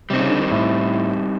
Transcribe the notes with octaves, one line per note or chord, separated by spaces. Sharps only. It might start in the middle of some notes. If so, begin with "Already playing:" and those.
C3 G3 C4 D#4
C#3
D3
D#3
A2